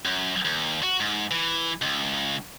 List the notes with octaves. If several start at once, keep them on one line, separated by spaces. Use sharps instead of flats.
F#2
D#2
F#4
G#2
E3
C#2